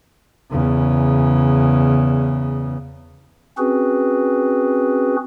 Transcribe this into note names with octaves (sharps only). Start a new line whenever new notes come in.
E2 C#3
C4 C#4 F#4 G#4 B4